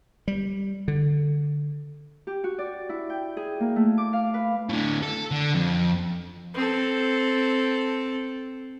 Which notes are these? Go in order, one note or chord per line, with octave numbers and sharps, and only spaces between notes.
G3
D3
G4
F#4
D5
E4
G5
G#4
A#3
A3
D6
F5
B4
A2 D3
A4
D3
F2
C4 A4